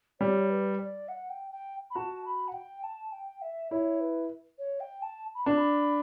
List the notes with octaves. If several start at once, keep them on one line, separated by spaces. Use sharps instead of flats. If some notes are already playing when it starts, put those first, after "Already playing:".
G3 C#5
B4
D5
F#5
G5
G5
B5
F#4 A5
B5
F#5
G5
A5
G5
E5
E4 C#5
B4
C#5
G5
A5
B5
D4 A5
B5